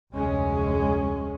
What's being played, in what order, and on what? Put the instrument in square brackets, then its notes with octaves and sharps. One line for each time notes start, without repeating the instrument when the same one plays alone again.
[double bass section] F1 D2 G#3 C#4